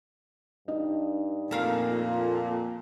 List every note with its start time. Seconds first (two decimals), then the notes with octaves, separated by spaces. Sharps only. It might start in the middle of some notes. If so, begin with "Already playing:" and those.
0.68 G2 D4 D#4 D#5
1.51 F2 A#2 A3 A#4 F5
1.91 F4